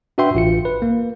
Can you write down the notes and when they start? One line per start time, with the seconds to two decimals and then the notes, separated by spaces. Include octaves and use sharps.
0.18 D4 F#4 B4 E5 G5 C6
0.35 A1 F4 C#7
0.65 B4
0.82 A#3